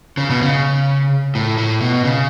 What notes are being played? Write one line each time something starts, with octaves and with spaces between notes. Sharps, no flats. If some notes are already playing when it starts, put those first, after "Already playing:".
C#3
B2
C#3
A2
A2
B2
C#3